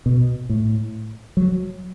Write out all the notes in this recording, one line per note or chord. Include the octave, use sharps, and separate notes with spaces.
B2
A2
F#3